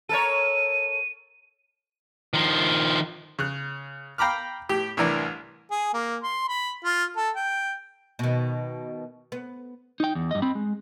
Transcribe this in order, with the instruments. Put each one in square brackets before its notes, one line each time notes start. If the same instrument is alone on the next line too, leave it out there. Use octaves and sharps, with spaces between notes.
[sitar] A4 A#4 C#5 [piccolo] D#7
[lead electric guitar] D#3 F3
[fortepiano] C#3 F#6
F5 G5 A#5 B5 D6 F6
A2 G4
C2 A2 E3 D4 A#4 D5
[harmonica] G#4
A#3
C6
B5
F4
A4
G5
[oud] B2 D#3
B3
[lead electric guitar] D#4 G5
E2
G2 D#5
C4 B5
G#3